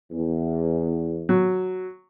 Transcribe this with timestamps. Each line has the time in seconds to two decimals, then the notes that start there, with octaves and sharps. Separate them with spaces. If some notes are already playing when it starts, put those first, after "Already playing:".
0.11 E2
1.29 F#3